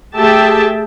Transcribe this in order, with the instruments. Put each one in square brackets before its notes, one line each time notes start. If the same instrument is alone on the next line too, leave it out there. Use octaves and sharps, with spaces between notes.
[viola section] A3 G4 G#4 E5 G5 A5